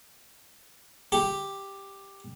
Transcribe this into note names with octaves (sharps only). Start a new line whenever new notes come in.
G4